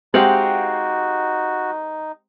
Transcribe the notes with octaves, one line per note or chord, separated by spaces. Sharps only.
G#3 C4 D#4 F#4 G4 F5 F#5